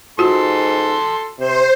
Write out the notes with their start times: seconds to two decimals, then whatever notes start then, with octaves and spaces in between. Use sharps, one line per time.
0.19 G#2 F4 F#4 A4 C6
1.39 C3 C5